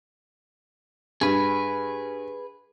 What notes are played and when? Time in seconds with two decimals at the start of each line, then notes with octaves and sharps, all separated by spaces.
1.21 G2 G#4 B4